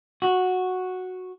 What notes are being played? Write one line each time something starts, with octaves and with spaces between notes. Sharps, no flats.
F#4